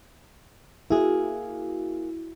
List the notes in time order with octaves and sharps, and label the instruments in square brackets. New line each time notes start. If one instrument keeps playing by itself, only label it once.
[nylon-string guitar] A#3 G#4 [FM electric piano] E4 F#4